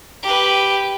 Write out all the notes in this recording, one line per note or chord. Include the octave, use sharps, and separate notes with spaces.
G4 B4